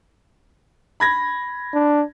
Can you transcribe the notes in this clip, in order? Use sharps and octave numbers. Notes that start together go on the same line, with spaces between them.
B5 G#6 A#6
D4